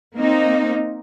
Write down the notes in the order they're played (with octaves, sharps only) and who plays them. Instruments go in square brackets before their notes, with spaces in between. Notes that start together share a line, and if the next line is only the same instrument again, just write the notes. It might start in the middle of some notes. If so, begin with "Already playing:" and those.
[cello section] A#3 C4 D#4